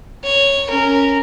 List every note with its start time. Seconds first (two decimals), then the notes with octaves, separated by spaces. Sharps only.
0.24 C#5
0.69 C#4 A#4